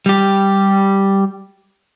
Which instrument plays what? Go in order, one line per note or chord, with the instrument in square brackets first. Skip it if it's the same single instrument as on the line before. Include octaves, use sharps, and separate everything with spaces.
[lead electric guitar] G3 G4